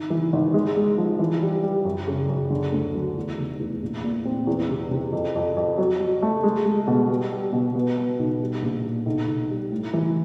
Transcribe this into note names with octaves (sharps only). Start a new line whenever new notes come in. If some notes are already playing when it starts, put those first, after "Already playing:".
Already playing: G#1
E3
G#1
G#3
G#3
F3
E3
G3
G3
F#2
C#3
F#2
D3
D2
F#3
E2
F1
E2
A#1
A#2
C4
E2
C3
C3
F2
F2
F2
F#3
F#3
A3
G#3
G#3
B2
G3
G3
B2
B3
B3
B1
G3
A#1
A#2
B1
B1
G3
A2
E3